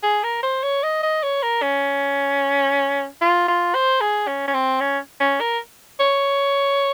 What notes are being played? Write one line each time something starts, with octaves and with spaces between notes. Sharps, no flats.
G#4
A#4
C5
C#5
D#5
D#5
C#5
A#4
C#4
F4
F4
C5
G#4
C#4
C#4
C4
C#4
C#4
A#4
C#5